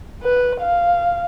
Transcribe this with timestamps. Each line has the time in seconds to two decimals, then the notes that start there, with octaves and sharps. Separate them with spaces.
0.23 B4
0.60 F5